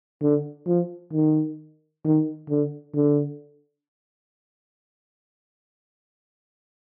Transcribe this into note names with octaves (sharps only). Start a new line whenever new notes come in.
D3
F3
D#3
D#3
D3
D3